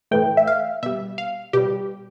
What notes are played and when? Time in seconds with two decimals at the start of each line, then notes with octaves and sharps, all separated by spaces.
0.11 A2 E3 A3 G5
0.37 E5
0.47 F5
0.83 B2 G3 E5
1.18 F5
1.53 B2 G3 G4